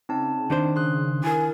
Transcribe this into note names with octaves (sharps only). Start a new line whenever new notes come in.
C#3 C4 D#4 A5
D#3 D4 C5
C#3 C6 D#6 F#6
E4 A#4 G#5